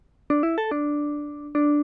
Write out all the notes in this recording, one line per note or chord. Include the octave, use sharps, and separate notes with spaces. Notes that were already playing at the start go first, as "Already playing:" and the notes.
D4
E4
A4
D4
D4